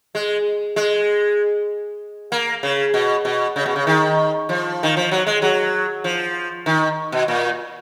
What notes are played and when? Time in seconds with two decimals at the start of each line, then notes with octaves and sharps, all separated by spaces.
0.15 G#3
0.76 G#3
2.32 A#3
2.63 C#3
2.94 B2
3.25 B2
3.56 C#3
3.66 B2
3.76 C#3
3.87 D#3
4.49 F3
4.83 D#3
4.97 F3
5.11 F#3
5.27 G#3
5.42 F#3
6.04 F3
6.66 D#3
7.12 B2
7.28 A#2